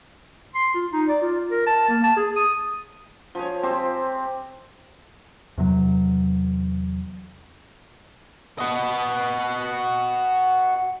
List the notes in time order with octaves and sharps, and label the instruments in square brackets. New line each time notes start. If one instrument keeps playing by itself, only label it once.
[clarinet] C6
F4
D#4
D5
F4
A#4
A5
A#3
A5
G#4
D#6
[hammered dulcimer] F3 G#4 C#5
C4 G4 C5
[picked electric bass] E2 C3 F#3
[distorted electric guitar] F#4 D#5